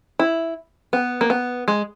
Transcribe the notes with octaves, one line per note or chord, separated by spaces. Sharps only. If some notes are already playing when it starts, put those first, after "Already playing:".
E4
B3
A#3
B3
G#3